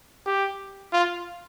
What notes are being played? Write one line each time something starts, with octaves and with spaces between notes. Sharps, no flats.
G4
F4